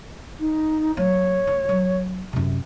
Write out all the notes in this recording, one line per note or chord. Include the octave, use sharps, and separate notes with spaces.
D#4
F#3 A#3 C#5
D2
F#3
F#2 C3